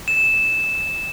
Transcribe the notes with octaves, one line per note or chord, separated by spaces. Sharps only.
E7